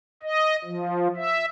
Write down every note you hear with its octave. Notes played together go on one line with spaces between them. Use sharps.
D#5
F3
E5